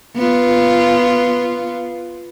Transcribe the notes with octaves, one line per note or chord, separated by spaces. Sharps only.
B3 F4